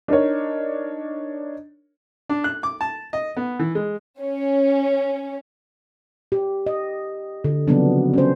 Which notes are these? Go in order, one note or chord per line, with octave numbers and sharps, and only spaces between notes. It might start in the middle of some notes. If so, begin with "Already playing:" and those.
D4 D#4 A#4 C#5
D4
F#6
D6
A5
D#5
B3
E3
G#3
C#4
G4
D#5
D3
C#3 F3 F#3 B3 C4 D4
C#4 C5